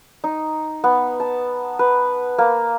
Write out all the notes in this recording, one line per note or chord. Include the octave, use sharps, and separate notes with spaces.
D#4
B3
A5
B4
A#3